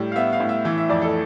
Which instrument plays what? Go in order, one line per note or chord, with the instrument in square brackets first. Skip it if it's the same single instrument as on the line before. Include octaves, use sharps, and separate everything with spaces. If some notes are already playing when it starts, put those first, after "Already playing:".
Already playing: [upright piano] A2 G3
F5
B3 E5
F5
A2
E5
E3
E5
F2 D5
A4